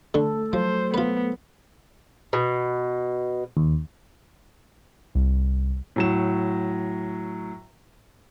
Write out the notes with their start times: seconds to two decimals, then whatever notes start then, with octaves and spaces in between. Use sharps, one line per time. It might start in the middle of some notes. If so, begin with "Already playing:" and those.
0.14 D3 A3 A4 C#6
0.53 F3 F#3 C5
0.94 B3 F4 B4
2.33 B2
3.57 D#2
5.15 C2
5.96 A2 F#3 E7